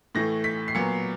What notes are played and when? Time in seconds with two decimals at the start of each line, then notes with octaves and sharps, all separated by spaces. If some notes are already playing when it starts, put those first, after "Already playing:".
0.15 A2 E3 A3 A#6
0.44 B6
0.68 C7
0.75 A#2 F#3 B3 C#7